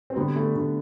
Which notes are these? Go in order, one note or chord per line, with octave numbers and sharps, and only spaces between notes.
C4
D3 G3 B3
A3
D3 A3